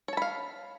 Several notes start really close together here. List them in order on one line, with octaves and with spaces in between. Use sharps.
C#5 A5 B5 F5